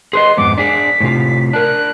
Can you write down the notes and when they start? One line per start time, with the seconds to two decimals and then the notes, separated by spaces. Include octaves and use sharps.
0.13 G#4 B4 D#5 C6
0.37 F2 G#2 B3 D6
0.58 D4 G#4 B6
1.01 A2 C3 F4
1.53 D4 A#4 F#6